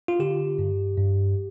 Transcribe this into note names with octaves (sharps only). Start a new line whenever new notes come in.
F4
D3 G4
G2
G2